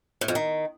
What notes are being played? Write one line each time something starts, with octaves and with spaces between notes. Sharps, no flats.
A2
F2
D#3